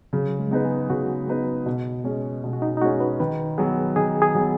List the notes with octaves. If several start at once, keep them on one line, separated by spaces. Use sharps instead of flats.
C#3 F#3
G#3
G#3 B3 D#4 B4
G#4
C#3 F#4
G#3 B3 D#4 B4
B2
G#3 C#4
B2
F#4
D#4
D#4
G#3 C#4 F#4
B4
D#3 B4
F#3 B3 G#4
D#3 G#4
G#4
F#3 B3